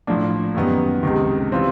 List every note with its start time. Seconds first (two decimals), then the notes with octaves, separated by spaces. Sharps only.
0.07 A2 F3 A#3 D4
0.55 F#2 D#3 G3 B3
1.03 C#2 C3 D#3
1.52 E3 G3 C4 F4